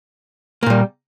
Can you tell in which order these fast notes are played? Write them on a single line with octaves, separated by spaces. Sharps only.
A#3 A#2 G3